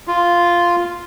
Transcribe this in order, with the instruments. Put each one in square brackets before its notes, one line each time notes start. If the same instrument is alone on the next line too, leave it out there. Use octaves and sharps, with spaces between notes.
[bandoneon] F4